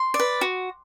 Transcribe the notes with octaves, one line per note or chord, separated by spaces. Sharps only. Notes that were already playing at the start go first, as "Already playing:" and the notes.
Already playing: C6
D5
B4
F#4